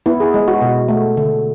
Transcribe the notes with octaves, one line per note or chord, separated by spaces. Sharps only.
B3 E4
G#4
G#3
F#4
B2
A3
D3